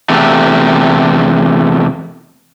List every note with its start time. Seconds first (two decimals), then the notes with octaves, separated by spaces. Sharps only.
0.09 E2 C3 A3